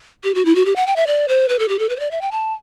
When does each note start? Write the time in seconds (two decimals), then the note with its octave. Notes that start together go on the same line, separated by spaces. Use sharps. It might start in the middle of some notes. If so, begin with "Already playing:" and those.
0.24 G4
0.35 F#4
0.45 E4
0.55 F#4
0.65 G4
0.76 F#5
0.87 G5
0.96 E5
1.07 D5
1.28 C5
1.49 B4
1.59 A4
1.69 G4
1.79 A4
1.89 B4
1.96 C5
2.00 D5
2.11 E5
2.21 G5
2.31 A5